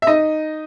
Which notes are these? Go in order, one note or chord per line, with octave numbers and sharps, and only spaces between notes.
E5
D#4 D#5